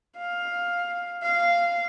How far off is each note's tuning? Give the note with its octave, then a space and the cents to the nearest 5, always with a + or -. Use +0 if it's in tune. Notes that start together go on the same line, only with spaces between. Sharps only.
F5 +10
F5 -10